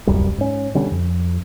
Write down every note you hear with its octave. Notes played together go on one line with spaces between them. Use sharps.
D1 C2 F#2 G3
G#2 C#4
B2 D3 G3 C#4
F2